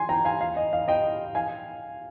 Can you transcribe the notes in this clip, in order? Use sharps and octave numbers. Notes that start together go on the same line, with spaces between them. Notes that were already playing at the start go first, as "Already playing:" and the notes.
Already playing: G#5 C6
G5 A#5
F5 G#5
F5
D#5
F5
D#5 G5
F5 G#5